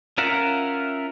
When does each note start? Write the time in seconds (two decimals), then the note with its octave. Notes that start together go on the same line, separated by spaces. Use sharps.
0.18 C#4 F4 A#4 E5 F#5